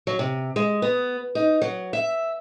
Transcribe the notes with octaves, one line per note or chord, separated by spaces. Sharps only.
F#3
C3
G#3
B3
D#4
F#3
E5